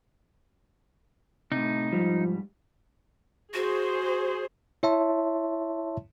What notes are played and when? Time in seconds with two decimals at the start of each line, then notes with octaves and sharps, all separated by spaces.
1.52 A2 C3 D#4
1.92 G#2 C3 F3 G3
3.54 F#4 G#4 C5
4.83 E4 C#5 E5 A5 C6